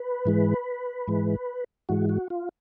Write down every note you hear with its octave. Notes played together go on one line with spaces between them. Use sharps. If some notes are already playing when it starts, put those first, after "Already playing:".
Already playing: B4
G#2 E3 G#3
G#2 E3 G#3
G#2 E3 G#3 F#4
F#4
F4